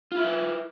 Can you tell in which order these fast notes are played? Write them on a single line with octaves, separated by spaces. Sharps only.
F4 E4 E5 B4